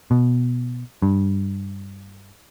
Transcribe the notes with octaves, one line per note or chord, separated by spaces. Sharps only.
B2
G2